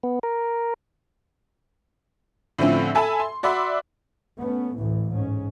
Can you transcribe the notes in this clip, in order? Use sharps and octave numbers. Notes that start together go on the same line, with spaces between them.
B3
A#4
A2 D3 F3 A3 C4 C#4
A4 E5 G#5 A5 B5
C6
F#4 D5 E5 B5 C6
A3 B3 C#4
A1 D2 A2 E3
G#2 C#4